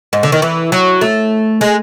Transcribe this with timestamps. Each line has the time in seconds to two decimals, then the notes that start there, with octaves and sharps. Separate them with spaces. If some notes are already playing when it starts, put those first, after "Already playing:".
0.13 G#2
0.23 D3
0.32 D#3
0.42 E3
0.72 F#3
1.01 A3
1.61 G#3